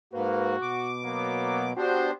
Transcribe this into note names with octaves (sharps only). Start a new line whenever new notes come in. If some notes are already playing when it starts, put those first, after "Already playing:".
G#2 A#3 F#4 B4
B2 D6
F#3 A#3 B3
B3 C4 D4 F#4 G4 C5